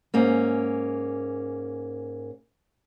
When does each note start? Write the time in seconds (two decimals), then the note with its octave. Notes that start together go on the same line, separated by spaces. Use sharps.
0.14 G#2 A#3 C#4